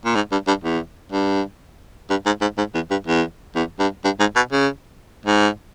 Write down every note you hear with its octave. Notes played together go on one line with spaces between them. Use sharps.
A#2
G#2
G2
G2
E2
G2
G2
G#2
G#2
G#2
E2
G2
E2
E2
G2
G2
G#2
B2
C#3
G#2